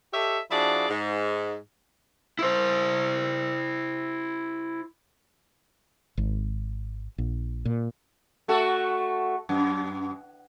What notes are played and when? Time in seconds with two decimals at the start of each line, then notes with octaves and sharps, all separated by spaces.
0.13 G4 A4 C#5 D#5 E5
0.51 F3 D4 E4 F#4 G#4 D5
0.89 G#2
2.39 E4 C5
6.17 G#1
7.18 A#1
7.65 A#2
8.48 A3 F#4 A4
9.49 F#2